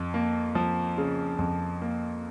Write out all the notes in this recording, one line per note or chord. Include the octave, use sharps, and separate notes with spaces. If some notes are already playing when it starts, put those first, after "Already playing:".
Already playing: F2
A#3
F3
C#3
F2
A#3